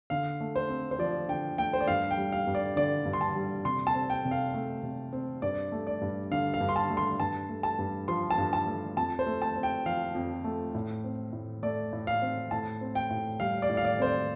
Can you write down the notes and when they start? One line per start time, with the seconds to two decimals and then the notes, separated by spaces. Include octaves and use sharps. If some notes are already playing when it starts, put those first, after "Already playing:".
0.10 D3 F5
0.41 A3
0.56 C5
0.69 C4
0.91 C5
0.99 F3 D5
1.28 D3 G5
1.58 A3 G5
1.73 C5
1.81 D5
1.88 G2 F5
2.11 G5
2.18 G3
2.32 F5
2.47 G2
2.55 D5
2.76 D3 D5
3.05 G2
3.13 C6
3.21 A5
3.36 G3
3.65 C3 C6
3.87 A5
3.95 C4
4.10 G5
4.25 C3
4.31 F5
4.54 A3
4.83 C3
5.13 C4
5.42 G2 D5
5.72 A3
5.87 D5
6.01 G2
6.31 D3 F5
6.54 F5
6.60 G2
6.69 C6
6.76 A5
6.90 A3
6.97 C6
7.20 G2 A5
7.49 A3
7.63 A5
7.79 G2
8.08 F3 C6
8.30 A5
8.38 G2
8.53 A5
8.67 A3
8.97 F2 A5
9.19 C5
9.26 A3
9.42 A5
9.56 C4
9.63 G5
9.86 F3 F5
10.15 F2
10.44 A3
10.75 A2
11.04 C4
11.33 A2
11.63 A3 D5
11.93 A2
12.07 F5
12.22 C4
12.51 A2 A5
12.81 C4
12.95 G5
13.10 A2
13.40 G3 F5
13.62 D5
13.69 A2
13.77 F5
13.85 D5
13.99 C4 C5
14.06 D5